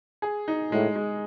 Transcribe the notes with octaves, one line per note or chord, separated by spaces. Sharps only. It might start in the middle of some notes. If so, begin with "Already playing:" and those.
G#4
D#4
A2 G#3
G#3